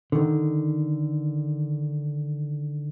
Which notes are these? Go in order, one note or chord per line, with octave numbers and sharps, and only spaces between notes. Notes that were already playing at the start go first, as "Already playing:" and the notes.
D3 D#3